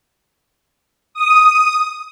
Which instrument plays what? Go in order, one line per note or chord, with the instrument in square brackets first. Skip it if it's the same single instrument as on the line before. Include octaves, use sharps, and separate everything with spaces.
[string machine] D#6